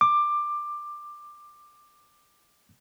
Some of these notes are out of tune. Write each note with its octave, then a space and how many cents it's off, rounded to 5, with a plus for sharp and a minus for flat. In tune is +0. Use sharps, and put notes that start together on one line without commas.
D6 +15